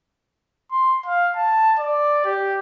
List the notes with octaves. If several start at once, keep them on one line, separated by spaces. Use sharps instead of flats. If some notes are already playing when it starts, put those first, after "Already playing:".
C6
F5
A5
D5
G4